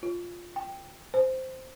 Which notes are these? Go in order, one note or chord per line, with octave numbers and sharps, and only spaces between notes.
F4
G5
C5